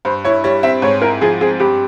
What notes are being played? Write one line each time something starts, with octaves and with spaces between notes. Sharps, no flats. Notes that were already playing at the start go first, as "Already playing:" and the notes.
G2 C5
E4 C#5
G3 C#5
C4 E5
G#2 C#5
E4 A#4
F3 G#4
C4 G#4
G2 G4